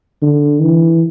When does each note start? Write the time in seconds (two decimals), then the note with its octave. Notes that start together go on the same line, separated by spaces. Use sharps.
0.22 D3
0.62 E3